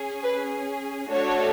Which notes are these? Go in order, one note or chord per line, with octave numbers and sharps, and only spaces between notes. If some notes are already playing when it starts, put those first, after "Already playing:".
Already playing: C#4 G#4
B4
A3 D4 F#4 A4 C#5